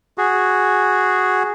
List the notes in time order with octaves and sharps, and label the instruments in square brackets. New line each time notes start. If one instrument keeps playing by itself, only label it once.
[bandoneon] F#4 G#4